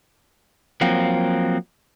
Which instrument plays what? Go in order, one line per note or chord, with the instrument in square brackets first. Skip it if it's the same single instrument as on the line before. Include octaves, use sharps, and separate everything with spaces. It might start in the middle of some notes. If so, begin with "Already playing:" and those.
[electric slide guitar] F3 F#3 A#3 C4